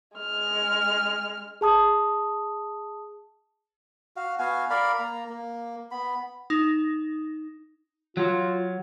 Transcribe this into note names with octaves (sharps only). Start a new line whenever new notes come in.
G#3 F6
G#4 A5 D#6
F#4 F5
B3 F#4 F5 G#5
A#4 D5 F5 B5
A#3 A#5
A#3
B3 B5
D#4
F#3 F4